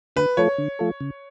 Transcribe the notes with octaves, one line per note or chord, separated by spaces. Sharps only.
D3 B4
F3 A3 F4 A4 C#5
D3
F3 A3 F4 A4
C#3